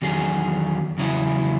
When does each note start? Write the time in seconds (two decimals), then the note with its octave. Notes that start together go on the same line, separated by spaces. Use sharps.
0.02 E2 D#3 F#3 C#4 G#4
0.98 E2 C#3 F#3 C#4 E4